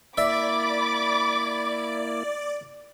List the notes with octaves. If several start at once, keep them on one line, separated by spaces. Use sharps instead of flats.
A#3 E4 D5 E5 B5 D6 A6